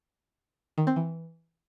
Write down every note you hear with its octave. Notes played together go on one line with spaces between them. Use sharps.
D#3
C4
E3